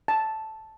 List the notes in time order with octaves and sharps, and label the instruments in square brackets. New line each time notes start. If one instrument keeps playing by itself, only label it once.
[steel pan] A5